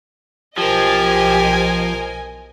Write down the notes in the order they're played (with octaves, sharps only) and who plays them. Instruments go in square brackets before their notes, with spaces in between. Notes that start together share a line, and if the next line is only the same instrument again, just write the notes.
[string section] B1 D#5 G#5 [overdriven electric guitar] F3 [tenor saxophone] G4 [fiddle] A#4 C5